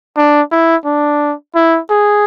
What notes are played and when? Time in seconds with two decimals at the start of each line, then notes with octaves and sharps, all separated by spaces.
0.17 D4
0.52 E4
0.85 D4
1.55 E4
1.90 G#4